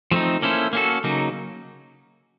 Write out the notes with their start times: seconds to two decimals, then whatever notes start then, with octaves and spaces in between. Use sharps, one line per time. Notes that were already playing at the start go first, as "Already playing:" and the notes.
0.11 F3 A3 C4 D#4
0.42 A#3 C#4 E4 A4 C5
0.73 A#3 C#4 F#4 A4
1.04 C#3 F#3 A#3 D#4